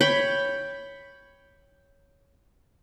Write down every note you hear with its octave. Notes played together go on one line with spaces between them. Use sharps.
C#5 G5 B5